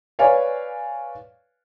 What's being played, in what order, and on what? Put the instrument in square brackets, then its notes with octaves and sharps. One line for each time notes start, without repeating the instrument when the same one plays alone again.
[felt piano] B4 C#5 D5 F5 G#5